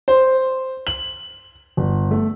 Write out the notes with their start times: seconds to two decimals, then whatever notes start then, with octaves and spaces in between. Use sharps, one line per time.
0.08 C5
0.87 F#7
1.77 G1
2.11 A3